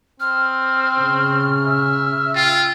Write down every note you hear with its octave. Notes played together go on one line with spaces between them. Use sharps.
C4 F6
C#3
E5
F4 G5